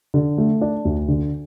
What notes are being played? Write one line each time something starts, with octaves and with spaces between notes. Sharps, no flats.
D3
A3
D4
D2
D3